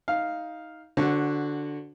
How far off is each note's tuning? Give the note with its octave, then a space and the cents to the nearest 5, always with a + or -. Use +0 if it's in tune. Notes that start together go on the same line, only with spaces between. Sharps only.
D#4 +15 F5 +0
D3 +0 F#4 +0 C5 +30